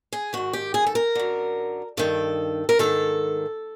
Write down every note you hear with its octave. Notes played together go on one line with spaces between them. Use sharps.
G#4
G#2 D#3 F#4
G4
G#4
A4
A#4
F#2 D3
G2 D#3 A4
A#4
G#2 D#3 A4